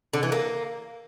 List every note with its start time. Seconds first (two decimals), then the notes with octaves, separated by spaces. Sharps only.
0.13 D3
0.23 E3
0.32 A#3